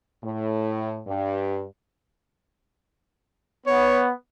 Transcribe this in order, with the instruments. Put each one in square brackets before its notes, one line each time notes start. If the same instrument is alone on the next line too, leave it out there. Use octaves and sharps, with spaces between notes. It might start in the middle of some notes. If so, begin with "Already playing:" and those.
[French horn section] A2
G2
[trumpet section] B3 [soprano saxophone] C#5